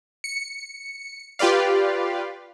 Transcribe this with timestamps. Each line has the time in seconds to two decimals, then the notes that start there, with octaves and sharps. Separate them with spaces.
0.24 C#7
1.39 F4 G4 B4 D5 F5